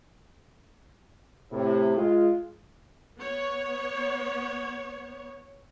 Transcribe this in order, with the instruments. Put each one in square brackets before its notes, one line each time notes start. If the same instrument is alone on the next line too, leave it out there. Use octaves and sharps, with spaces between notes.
[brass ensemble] A2 C3
G#3 F4
[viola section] B3 C#5